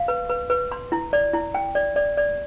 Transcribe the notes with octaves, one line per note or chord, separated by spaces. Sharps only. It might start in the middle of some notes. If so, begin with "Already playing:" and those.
Already playing: F5
B4
B4
B4
C6
E4
D5
E4
G5
D5
D5
D5